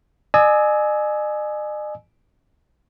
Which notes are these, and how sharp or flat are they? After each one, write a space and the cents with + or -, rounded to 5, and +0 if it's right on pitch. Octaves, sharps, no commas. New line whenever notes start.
D#5 -45 G#5 +20 E6 -30